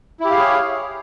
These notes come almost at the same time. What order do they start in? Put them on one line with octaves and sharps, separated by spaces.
E4 G4 F5 G#4 C#5